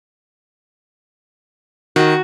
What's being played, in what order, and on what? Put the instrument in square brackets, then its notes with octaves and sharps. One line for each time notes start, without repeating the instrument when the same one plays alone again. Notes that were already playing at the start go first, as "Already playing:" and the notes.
[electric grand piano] D#3 [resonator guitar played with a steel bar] F#4